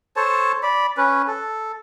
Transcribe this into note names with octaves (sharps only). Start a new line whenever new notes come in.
A4 C5 C#5 A5
D5 B5
C#4 B4
A4